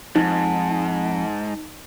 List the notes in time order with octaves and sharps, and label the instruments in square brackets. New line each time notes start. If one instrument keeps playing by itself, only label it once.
[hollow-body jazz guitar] F2 [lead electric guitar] G#2 [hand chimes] D#4